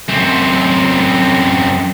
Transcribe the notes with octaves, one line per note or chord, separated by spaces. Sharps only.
F#2 C4